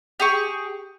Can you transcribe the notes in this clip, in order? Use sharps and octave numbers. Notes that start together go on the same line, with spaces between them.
G4 G#4 C#6